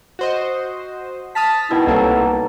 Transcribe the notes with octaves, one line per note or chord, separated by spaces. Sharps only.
F#4 C5 D#5
A5 D#6 F6 B6
B2 D#3 E4
C2 F#3 A#3 A4 A5